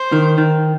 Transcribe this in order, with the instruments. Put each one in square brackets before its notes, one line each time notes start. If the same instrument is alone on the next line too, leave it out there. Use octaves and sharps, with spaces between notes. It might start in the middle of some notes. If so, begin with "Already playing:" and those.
Already playing: [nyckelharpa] C5
[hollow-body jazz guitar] D#3
D#3